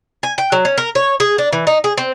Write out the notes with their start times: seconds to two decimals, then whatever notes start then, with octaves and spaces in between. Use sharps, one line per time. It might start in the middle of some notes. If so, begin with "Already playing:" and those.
0.23 G#5
0.38 G5
0.52 F#3
0.65 C#4
0.78 A#4
0.95 C#5
1.20 G#4
1.38 D4
1.53 E3
1.67 D#4
1.84 G#4
1.98 C4